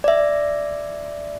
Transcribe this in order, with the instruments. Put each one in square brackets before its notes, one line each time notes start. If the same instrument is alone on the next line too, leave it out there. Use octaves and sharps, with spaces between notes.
[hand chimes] D5 E5